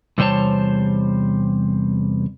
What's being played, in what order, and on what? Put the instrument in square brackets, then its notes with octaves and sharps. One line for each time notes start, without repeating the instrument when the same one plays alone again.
[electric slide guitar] E2 C3 G3 C5 C#5 A5